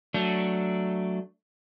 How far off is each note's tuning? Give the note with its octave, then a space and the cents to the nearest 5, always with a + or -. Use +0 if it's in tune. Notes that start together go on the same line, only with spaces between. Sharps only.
F#3 +0 A3 +0 D4 +0